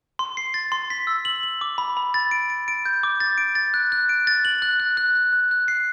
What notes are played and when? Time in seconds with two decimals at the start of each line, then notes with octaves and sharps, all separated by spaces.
0.19 C6
0.37 C7
0.54 A6
0.72 C6
0.90 B6
1.07 E6
1.25 F#7
1.43 F#7
1.61 D6
1.78 B5
1.97 B5
2.14 A6
2.31 D7
2.50 D7
2.68 D7
2.86 G6
3.03 D6
3.20 A6
3.38 D7
3.55 A6
3.74 F#6
3.92 F#6
4.09 D7
4.27 A6
4.45 F#7
4.62 F#6
4.80 F#6
4.97 F#6
5.15 F#6
5.33 F#6
5.51 F#6
5.68 C7